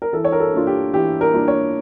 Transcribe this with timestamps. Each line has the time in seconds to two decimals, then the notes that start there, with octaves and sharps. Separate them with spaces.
0.02 A#4
0.13 E3 A4
0.25 C#5
0.32 A#4
0.40 A4
0.54 A#3 D4 F4
0.67 G4
0.93 E3 G4
1.21 A#4
1.34 A#3 D4 F4
1.48 C#5